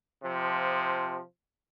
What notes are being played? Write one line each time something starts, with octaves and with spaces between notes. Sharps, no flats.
C3 F3